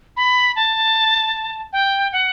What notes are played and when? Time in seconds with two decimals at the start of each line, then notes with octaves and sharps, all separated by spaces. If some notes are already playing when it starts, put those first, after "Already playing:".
0.17 B5
0.56 A5
1.73 G5
2.12 F#5